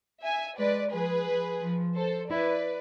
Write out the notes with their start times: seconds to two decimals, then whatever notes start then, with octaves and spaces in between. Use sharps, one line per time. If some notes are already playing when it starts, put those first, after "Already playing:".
0.23 E5 G#5
0.59 G#3 B4 D5
0.92 F3 G#4 B4
1.27 F3
1.61 F3
1.95 A4 C5
2.30 E4 B4 D5